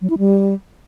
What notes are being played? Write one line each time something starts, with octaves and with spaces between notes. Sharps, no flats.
F#3
E4
G3